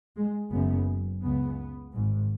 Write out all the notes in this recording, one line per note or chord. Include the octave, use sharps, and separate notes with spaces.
G#3
F#1 F#2 C#3 B3
C#2 C#3 B3
G#1 G#2